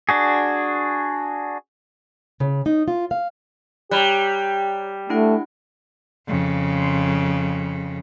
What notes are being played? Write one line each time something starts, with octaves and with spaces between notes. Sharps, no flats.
D4 F#4 G#4
C#3
D#4
F4
F5
G3 G4 C#5 A#5 F#6
A3 D4 E4 F#5
F2 C#3